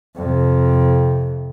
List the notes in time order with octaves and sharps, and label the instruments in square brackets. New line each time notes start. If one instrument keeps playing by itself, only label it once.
[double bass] F2 C3